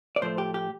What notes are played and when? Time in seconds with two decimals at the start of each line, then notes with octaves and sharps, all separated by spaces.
0.16 D5
0.21 A2 F3 A3 C5
0.38 G4
0.54 G4